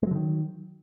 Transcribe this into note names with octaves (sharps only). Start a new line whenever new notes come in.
D3 D#3 F#3 G#3